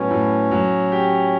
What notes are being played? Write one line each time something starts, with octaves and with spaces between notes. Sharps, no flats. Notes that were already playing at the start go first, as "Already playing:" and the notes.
Already playing: A2 F#3 B3 C#4
A2
F#3
G4